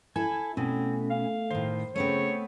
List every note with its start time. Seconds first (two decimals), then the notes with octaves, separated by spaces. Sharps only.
0.16 E4 A4 G#5
0.57 B2 A3 C4 C#4
1.10 F5
1.51 A2 D#3 C5
1.95 C#3 A3 B3 C4 C#5